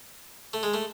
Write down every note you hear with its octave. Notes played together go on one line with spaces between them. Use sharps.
A3
G#3
A3